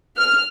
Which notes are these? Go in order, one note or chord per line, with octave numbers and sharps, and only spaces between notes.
F6